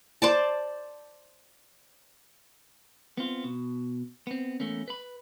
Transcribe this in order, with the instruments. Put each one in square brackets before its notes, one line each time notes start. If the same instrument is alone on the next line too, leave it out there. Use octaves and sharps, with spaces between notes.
[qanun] C5 D5 A5
[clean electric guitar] B3 C4 F4
B2
B3 C4
E2 A3 A#3 C#4
B4 B5